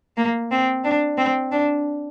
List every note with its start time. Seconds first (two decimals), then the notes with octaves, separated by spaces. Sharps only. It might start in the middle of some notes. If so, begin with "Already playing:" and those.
0.17 A#3
0.51 C4
0.84 D4
1.18 C4
1.52 D4